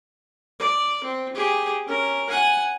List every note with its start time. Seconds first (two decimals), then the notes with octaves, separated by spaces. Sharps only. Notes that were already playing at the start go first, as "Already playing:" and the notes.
0.59 D5
1.04 C4
1.35 G4 G#4
1.87 C#4 A#4
2.30 F#5 G#5